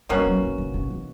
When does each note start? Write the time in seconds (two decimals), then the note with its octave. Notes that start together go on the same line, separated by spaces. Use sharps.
0.09 B2 G3 A#3 C#4 F#4
0.26 F#3
0.42 E3
0.58 D3
0.74 C#3
0.90 E3